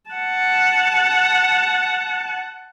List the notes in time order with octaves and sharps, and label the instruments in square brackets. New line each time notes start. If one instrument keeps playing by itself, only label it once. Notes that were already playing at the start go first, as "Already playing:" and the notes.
[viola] F#5 A5